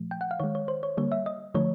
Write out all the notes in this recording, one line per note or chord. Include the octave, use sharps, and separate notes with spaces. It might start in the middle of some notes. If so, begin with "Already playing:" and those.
Already playing: A#2 F3 A3
G5
F#5
F5
D#3 G#3 C#5
C#5
C5
C#5
D3 G3 A#3 C#5
E5
D#5
D3 F3 A3 C#5